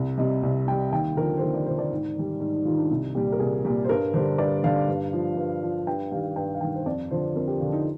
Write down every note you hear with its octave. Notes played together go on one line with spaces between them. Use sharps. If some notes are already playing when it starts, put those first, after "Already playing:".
Already playing: C2
C3 G3 D#5
C2
C3 G3 G5
D#2 G5
D3 F3 A#4
C5
D#2 A#4
D5
D3 F3 C5
D5
G#2
D#3 G3
G#2 D#4
D#4
D#3 G3 F4
D4
C2 D#4
A#2 G3 G4
A#4
C2 G#4
A#2 G3
C5
G2 A#4
D3 G3 C5
G2 D5
D3 G3 F5
G2
F3
G2
F3
G2 G5
D#3 G3 F5
G2 G5
F5
D#3 G3 G5
C5
F2 D5
D3 F3 C5
F2 A#4
G4
D3 F3 F4
D#4